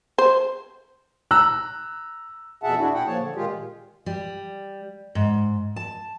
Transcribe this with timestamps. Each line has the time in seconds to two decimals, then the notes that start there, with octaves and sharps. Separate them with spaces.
0.18 C5
1.31 A#5 E6 F#6
2.63 F2 B2 G#4 E5 F#5 A5
2.78 D4 E4 F#4 G#4
2.94 A#2 G#4 F#5 G5
3.07 F3 A#3 C#5 A5
3.19 D3
3.35 A#2 D#3 G#3 F4 G4 G#4
4.06 G3
5.15 G#2
5.76 A5